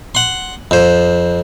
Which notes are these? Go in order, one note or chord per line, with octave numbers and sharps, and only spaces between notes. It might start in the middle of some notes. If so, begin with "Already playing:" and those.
F#5 C6
F2 C5